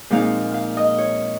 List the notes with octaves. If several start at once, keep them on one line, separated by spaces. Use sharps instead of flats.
A#2 F3 G#3 C4 D#4 F5
F5
D#5
C#5